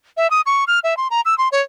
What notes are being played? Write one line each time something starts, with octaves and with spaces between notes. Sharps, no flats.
E5
D#6
C#6
F6
E5
C6
A#5
E6
C6
C#5